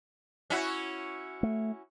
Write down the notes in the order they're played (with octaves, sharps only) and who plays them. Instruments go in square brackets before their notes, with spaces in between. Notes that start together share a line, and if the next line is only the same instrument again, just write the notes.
[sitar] C#4 E4 F#4
[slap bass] A3